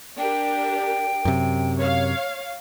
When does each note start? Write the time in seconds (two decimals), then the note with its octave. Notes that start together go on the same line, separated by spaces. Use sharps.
0.18 D4 G4 A#4 G5
1.25 F#2 C3
1.78 C#5 F5